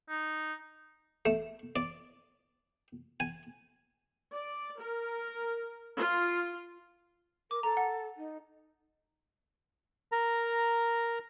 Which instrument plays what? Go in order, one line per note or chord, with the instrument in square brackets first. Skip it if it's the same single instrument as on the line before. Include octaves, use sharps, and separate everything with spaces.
[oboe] D#4
[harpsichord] A3
D5
G#5
[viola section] D5
A#4
F4
[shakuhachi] A#4 [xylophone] D6
[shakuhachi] A4 [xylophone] A#5
[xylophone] F#5
[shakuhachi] D#4
[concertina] A#4 A#5